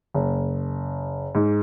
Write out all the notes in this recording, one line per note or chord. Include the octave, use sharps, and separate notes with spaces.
F#1
G#2